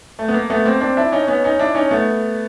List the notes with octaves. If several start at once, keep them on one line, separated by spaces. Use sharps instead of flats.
A3
B3
A#3
A3 B3
A#3 C4
C4 D4
D4 E4
C#4 D#4
B3 C#4
C#4 D#4
D4 E4
C#4 D#4
A3 B3